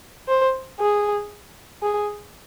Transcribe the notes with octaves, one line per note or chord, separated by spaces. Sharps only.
C5
G#4
G#4